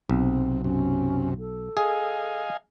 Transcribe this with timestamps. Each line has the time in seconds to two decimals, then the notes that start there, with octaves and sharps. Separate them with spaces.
0.09 B1 C3 C4
0.64 F#2 C3 C#4
1.39 A4
1.77 G#4 D#5 F5 G#5